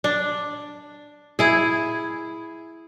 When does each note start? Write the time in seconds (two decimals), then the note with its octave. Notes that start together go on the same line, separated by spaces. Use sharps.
0.04 D4
1.39 E4 G#4